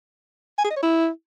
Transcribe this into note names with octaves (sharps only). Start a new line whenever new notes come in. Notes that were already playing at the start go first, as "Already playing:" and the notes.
G#5
G#4
D#5
C#5
E4